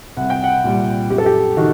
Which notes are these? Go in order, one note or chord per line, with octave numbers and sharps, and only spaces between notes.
C2 F#5
G5
F#5
A#2 G3
F#2 G4
A4
G4
D#3 F#4